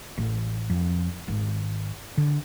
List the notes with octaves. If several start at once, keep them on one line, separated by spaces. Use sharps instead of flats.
A1
F2
G#1
D3